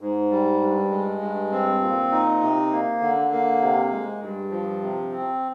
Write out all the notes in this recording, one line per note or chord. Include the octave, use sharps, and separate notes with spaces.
G#2
G3
G2
G#3
G2
C4
A#2
D#4
C3
A#3
D3
A#3
C3
G#3
G2
F3
C3
C4